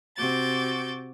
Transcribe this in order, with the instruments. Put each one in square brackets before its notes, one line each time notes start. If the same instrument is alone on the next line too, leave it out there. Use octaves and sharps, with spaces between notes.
[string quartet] C3 F#4 D6 G6 A6